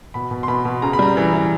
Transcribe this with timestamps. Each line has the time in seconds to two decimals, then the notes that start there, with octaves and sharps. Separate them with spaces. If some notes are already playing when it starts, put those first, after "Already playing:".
0.14 B2 B5
0.31 B2
0.43 C6
0.48 B2 B5
0.65 B2
0.82 C#3 A#5
0.93 B5
0.99 G3 A#5
1.17 E3
1.34 E3